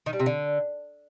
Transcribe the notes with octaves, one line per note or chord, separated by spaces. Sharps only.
D#3
G3
C3
D3